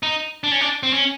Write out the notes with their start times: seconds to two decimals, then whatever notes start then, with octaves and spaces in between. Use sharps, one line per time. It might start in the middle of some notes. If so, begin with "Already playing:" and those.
0.03 D#4
0.44 D4
0.51 C#4
0.61 D4
0.83 C4
0.93 C#4